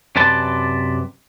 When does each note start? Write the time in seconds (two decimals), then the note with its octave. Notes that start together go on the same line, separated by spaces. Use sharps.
0.16 F#2 C3 B4 D5 A5 C6